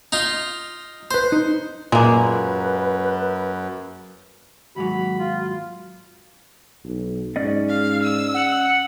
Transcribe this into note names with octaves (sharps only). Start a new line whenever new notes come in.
D#4 F4
B4 C5 C6
D#4
F#2 A#2 G#3 A#3 B4
D#2 G#2 F#3 F#4 B5
F4
B1
G#2 C#4 D5 D#5
F5
E6
F#5